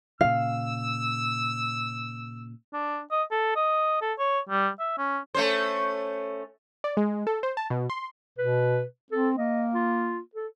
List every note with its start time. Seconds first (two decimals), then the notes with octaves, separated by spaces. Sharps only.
0.21 A#2 C#3 F5 E6
2.73 D4
3.11 D#5
3.31 A4
3.56 D#5
4.01 A4
4.19 C#5
4.49 G3
4.79 E5
4.98 C#4
5.34 A3 C#4 C5
6.84 D5
6.97 G#3
7.27 A4
7.43 C5
7.57 A5
7.70 B2
7.90 C6
8.38 B2 B4
9.12 C4 A4
9.38 A#3 D#5
9.74 F4
10.35 A4